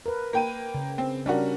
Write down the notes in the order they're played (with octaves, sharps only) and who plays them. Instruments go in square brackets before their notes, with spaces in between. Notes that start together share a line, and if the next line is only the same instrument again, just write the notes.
[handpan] A#4 B4
[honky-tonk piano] A#3 G5 D#7
[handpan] C#3
[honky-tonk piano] C4
[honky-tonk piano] G3 C#4 F#4 [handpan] D4 A#4